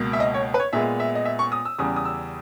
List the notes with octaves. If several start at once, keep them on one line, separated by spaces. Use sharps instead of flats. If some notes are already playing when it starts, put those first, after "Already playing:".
Already playing: C#2 B2 A#3
E5
D#5
C#5
B4
C#5
A#2 G#3 B3 E5
E5
D#5
E5
C#6
D#6
E6
E2 C#3 G3 D#6
D#6
E6